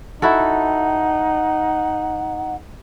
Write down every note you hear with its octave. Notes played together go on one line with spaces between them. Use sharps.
D#4 E4 F#4 A4 F#5